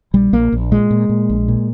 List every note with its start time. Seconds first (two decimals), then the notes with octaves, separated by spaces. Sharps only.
0.14 A#1 G3
0.33 A#1 A#3
0.52 A#1
0.71 A#2 G#3
0.91 A#2
1.09 A#2
1.29 A#1
1.48 A#2